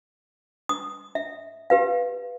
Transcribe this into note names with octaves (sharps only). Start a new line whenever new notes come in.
D#6
E5
G4 B4 F5